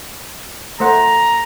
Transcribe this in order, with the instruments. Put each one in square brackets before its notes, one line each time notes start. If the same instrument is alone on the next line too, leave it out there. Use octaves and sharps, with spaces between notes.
[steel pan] A3 C5 F#5 [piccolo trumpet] A#5